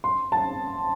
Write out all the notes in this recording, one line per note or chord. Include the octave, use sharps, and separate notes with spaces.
C6
A5